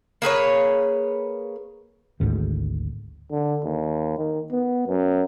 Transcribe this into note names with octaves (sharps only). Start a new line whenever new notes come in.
A#3 G#4 B4 C#5
G#1 D2 G#2 D#3
D3
D#2
D#3
B3
F#2